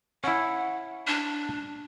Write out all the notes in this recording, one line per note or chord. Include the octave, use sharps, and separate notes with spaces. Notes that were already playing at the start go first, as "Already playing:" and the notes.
C#4 E4 F#5
D4